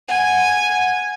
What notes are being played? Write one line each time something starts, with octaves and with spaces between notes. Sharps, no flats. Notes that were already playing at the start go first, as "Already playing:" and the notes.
F#5 G#5